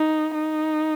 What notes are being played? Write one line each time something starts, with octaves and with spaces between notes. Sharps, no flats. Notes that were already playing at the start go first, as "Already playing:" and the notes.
Already playing: D#4
D#4